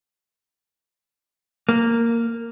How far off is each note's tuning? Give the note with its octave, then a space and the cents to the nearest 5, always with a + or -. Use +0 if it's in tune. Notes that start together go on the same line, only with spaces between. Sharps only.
A#3 -10